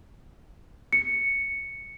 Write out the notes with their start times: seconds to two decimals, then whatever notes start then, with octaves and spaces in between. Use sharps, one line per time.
0.93 C#7